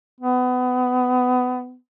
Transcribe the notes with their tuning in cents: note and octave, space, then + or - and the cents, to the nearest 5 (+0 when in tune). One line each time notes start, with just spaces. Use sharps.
B3 +25